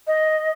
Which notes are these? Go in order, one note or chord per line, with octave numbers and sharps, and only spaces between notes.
D#5